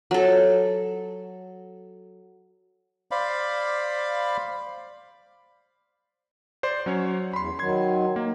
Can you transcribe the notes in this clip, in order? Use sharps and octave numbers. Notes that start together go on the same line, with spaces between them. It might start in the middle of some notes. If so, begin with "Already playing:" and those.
F#3 A4
C5 D5 F5 B5
C5 D5 C6
F#3 C#4 C#5
E2 B5 C6
D#3 F#3 C6 G#6
A#3